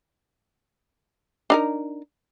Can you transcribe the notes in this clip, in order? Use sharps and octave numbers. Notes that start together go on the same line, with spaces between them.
D4 D#4 A#4